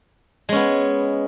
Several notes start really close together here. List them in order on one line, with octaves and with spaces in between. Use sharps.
G#3 C#4 B3